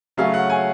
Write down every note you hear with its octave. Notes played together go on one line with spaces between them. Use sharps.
C#3 F#3 A3 C#4 F5
F#5
G#5